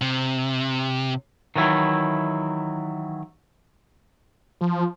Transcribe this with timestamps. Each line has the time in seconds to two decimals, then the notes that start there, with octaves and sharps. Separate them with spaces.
0.01 C3
1.56 D#3 E3 F#3 E4
4.61 F3